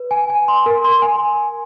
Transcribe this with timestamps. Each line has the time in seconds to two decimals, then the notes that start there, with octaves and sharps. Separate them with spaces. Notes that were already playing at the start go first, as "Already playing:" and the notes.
Already playing: B4
0.11 G#5
0.30 G#5
0.48 C6
0.66 A#4
0.84 C6
1.02 G#5